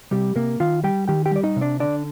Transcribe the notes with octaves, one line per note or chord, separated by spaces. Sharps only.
C3 G3 G4
C3 A#3 A#4
D#3 F4 F5
G3 G4 G5
D#3 G4 G5
G4 G5
G3 D5
D#4 D#5
C3
D4 D5
D3 D4 D5